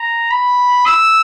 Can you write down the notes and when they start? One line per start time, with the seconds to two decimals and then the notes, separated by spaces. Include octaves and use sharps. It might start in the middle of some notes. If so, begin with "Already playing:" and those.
Already playing: A#5
0.31 B5
0.86 E6